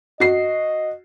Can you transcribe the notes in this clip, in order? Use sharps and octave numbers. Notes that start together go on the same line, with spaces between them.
F#4 D#5 C7